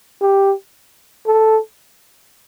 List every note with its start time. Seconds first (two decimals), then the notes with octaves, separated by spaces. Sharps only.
0.21 G4
1.27 A4